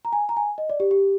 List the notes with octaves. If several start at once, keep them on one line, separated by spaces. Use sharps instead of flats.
A#5
G#5
A#5
G#5
D#5
D5
G4
G4